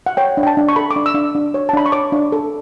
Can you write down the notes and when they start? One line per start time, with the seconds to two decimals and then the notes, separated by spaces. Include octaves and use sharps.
0.06 F#5
0.17 C#5 G5
0.37 D4
0.43 G5
0.47 A5
0.57 D4
0.69 C#6
0.76 A4 B5
0.91 D6
0.96 D4
1.06 E6
1.14 D4
1.35 D4
1.54 C#5
1.69 A5
1.73 D4 B5
1.86 C#6
1.92 C#5 D6
2.12 D4
2.32 A4